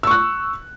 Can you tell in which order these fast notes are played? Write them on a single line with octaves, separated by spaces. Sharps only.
E6 C#6 F#6